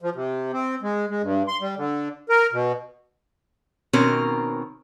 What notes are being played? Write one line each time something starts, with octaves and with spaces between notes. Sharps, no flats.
F3
C3
C4
G#3
G#3
G2
C6
G3
D3
A#4
B2
B2 D#3 C4 C#4 A#4